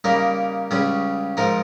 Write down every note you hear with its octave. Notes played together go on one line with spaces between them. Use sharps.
C#3 G3 A#3 D#4 A#4
C#2 C#3 G3 C#4 G#4
G#2 F3 G#3 D#4 A#4